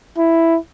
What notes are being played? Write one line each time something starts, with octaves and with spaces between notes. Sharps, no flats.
E4